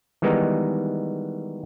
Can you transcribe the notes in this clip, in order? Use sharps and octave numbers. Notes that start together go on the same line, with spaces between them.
D#3 E3 G3 G#3 B3 D#4